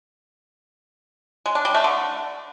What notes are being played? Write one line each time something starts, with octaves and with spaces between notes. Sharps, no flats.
G#3
D4
G3
A3
D3